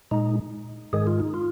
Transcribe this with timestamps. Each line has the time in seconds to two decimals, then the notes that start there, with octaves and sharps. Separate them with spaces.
0.11 A#2 G#3 D#4
0.93 G#2 D#3 G#3 G#4
1.07 F4
1.20 D#4
1.34 F4